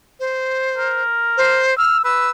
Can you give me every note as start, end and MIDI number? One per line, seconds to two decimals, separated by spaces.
0.20 1.02 72
0.77 1.62 70
1.38 1.77 72
1.78 2.02 88
1.78 1.97 89
2.04 2.30 71
2.04 2.30 88